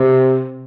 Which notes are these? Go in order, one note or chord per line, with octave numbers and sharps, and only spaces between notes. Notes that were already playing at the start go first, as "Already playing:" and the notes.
Already playing: C3